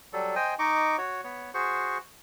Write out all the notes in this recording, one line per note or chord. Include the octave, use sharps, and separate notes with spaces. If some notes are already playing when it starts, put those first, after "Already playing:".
F#3 G3 A4
C5 D#5 G5 G#5
D#4 D#5 C#6 D6
F#4 C#5
B3 C#5
F#4 G#4 C5 C#6